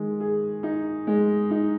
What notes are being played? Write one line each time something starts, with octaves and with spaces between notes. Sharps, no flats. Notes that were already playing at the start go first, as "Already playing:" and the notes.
Already playing: D#3 G#3
G#4
D#4
G#3
D#4